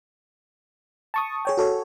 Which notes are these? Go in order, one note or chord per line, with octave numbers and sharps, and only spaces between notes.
A5 C#6 D#6
G#4 C#5 G5
F#4 A4 C#5